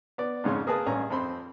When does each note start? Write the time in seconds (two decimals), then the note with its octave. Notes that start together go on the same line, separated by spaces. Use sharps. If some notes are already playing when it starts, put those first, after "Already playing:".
0.18 B3 D5
0.44 F2 G#2 C#3 C#4 C6
0.67 A#3 G#4 A#4 B4 A5 D#6
0.86 A1 G2 C#4 G#5 A#5
1.10 F2 C4 B5 C6